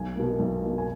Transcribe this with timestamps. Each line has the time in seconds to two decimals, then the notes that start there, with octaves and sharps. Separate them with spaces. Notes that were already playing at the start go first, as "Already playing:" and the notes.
Already playing: B1 G#5
0.16 B2 A#3
0.39 B1
0.62 B2 A#3
0.78 G#5